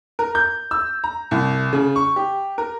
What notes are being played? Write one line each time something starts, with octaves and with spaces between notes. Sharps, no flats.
A#4
G6
E6
A#5
C2
C#3
C#6
G4
A#4